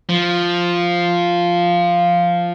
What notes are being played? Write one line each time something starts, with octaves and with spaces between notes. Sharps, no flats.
F3